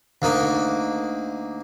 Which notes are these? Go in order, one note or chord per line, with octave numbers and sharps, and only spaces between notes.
D2 A#3 D#4